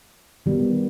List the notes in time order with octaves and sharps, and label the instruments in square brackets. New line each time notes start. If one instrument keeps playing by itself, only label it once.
[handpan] D#3 G3 B3